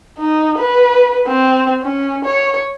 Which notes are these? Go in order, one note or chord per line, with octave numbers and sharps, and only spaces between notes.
D#4
B4
C4
C#4
C#5